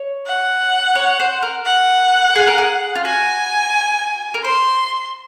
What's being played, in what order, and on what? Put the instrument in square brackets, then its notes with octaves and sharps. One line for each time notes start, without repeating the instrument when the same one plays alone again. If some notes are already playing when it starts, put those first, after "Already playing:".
Already playing: [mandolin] C#5
[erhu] F#5
[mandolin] C#5
C5
A#4
[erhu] F#5
[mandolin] G#4
A#4
G#4
F4
[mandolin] F#4 [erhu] G#5
[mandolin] A#4
[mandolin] C5 [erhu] C6